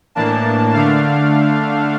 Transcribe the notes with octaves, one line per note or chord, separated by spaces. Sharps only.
A2 E3 A#3 D4 A5
D3 A3 D4 F5